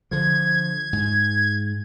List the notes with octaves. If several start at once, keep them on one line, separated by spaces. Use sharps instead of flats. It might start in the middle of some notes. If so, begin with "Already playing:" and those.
D3 F3 G#6
G#2